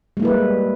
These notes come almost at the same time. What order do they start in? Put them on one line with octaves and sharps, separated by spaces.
G#3 A#3 E4 B4 G3